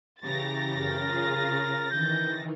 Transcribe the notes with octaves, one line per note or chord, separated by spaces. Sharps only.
C#3 E3 G4 A#5 A6 A#6
F#2 A#4 G5
F4 G#4
D#3 E3 G6